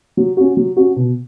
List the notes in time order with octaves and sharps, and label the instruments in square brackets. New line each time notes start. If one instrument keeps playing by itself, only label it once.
[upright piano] F#3
C#4 F#4
F#3
C#4 F#4
B2